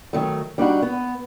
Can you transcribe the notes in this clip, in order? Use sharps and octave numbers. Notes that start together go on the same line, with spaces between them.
D#3 F#3 A3
G3 D4 D#4 F#4
B3